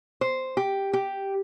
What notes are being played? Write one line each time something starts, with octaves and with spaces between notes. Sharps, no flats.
C5
G4
G4